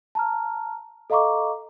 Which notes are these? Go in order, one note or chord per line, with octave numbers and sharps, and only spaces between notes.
A5 A#5 F6
A4 D#5 F5 A#5 C#6 D6